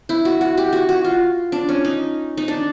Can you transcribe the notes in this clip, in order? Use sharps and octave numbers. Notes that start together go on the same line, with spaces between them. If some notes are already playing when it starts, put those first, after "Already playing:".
E4
F#4
F#4
G4
F#4
F#4
F4
D4
C#4
D#4
D#4
D4